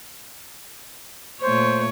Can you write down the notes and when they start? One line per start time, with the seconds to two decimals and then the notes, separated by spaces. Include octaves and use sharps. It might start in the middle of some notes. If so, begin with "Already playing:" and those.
1.41 A#2 A3 C5 C#5